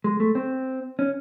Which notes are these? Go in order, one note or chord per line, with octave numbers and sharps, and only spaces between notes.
G#3
A3
C4
C#4